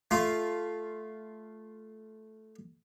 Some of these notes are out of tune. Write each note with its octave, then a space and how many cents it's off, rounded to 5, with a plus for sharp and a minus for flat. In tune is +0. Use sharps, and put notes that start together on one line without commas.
A3 -10 F4 +0